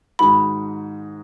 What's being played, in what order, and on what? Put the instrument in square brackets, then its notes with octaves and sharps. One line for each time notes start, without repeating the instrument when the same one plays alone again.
[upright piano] G#2 D#3 G#3 D#4 F#4 [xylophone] B5